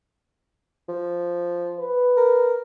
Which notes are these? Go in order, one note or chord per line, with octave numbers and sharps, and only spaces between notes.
F3
B4
A#4